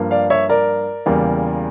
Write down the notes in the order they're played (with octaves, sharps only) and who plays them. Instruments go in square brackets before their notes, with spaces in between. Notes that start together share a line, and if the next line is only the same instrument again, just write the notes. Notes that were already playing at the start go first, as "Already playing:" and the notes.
Already playing: [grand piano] G2 F3 A#3
D5 F5
C#5 E5
A#4 D5
E2 C#3 G3 A#3